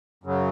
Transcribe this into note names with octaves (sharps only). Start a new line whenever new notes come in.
F#2 C#3 F#3